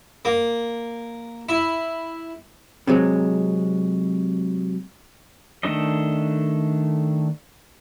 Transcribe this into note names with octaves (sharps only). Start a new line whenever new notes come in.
A#3
E4
C3 F#3 G#3
D#3 A3 D4 A4 D#5